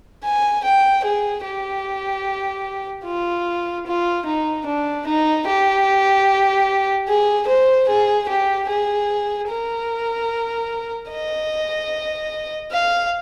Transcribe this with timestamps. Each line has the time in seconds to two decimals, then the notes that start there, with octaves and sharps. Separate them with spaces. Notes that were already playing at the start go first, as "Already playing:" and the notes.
0.24 G#5
0.64 G5
1.05 G#4
1.44 G4
3.06 F4
3.86 F4
4.26 D#4
4.66 D4
5.07 D#4
5.47 G4
7.08 G#4
7.48 C5
7.88 G#4
8.29 G4
8.69 G#4
9.49 A#4
11.10 D#5
12.72 F5